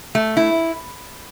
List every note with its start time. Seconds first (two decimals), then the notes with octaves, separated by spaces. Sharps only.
0.15 A3
0.37 E4